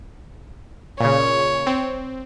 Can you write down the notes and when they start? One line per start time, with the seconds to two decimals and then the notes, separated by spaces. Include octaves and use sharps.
1.00 A#2 C#3 C#5
1.67 C4